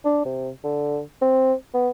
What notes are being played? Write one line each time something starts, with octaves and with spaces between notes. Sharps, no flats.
D4
C3
D3
C4
B3